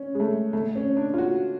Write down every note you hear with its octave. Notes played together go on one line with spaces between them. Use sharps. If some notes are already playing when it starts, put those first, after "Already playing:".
Already playing: C#4
G#3
A3
A3
C#4
D4
F4
F#4